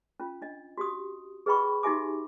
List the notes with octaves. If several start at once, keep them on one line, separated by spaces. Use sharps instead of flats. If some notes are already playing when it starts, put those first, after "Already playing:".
C#4 F4
D4 D#5
F#4 G4 D#6
G#4 B4 D#5 G5 B5 C#6
D#4 F#4 G4 E5 G#5 D6